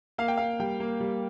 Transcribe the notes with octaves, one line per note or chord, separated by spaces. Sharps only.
A#3 F5
G5
A#3 F5
G3 G5
A#3
G3